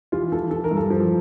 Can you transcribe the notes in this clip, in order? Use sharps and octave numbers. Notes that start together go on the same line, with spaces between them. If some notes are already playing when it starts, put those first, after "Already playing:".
E3 F4
E3 A4
E3 A4
A#4
G2
A4
F3